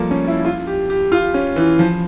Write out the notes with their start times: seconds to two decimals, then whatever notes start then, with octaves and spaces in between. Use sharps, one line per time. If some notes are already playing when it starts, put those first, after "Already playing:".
Already playing: F3 G3 A3 A#3
0.11 C#4
0.28 E4
0.45 F4
0.67 G4
0.90 G4
1.12 F4
1.34 C#4
1.56 E3
1.79 F3